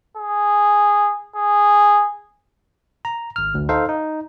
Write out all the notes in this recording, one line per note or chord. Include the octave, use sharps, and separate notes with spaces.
G#4
G#4
A#5
G#1 F6
D2
D#4 A4 C5 F5
D#4